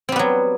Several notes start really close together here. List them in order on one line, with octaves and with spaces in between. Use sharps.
C4 G3 B3 F#3